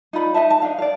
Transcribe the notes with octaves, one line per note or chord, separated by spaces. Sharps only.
D#4 F4 D5 B5
D#4 D#5 E5 A5
A5
D4 D#4 F5
D5 F5